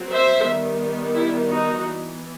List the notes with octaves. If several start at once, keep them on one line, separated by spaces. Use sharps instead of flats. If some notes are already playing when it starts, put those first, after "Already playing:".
Already playing: F#3 C4
C5 E5
D#3 G3 B3
E4 G4
D#4 F#4
E3 B3